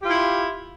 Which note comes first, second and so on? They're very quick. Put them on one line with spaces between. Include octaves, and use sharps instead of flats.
G4 F4 E4